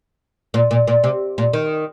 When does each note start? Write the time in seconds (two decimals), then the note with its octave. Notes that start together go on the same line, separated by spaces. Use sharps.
0.54 A#2
0.71 A#2
0.87 A#2
1.04 C3
1.38 A#2
1.53 D#3